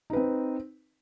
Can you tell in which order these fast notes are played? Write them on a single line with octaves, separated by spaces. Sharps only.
D#4 B4 C4